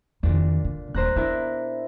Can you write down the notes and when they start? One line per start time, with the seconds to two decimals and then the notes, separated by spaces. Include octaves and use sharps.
0.23 F2 A#2 D#3 D4
0.65 D3
0.94 D#1 A#3 C5 A#5 F#6
1.16 B3 D4 E4 A#4